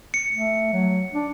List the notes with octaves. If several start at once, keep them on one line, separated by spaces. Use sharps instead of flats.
C#7
A3
F#3
D4